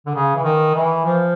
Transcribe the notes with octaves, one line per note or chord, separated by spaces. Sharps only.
D3
C#3
E3
D#3
E3
F3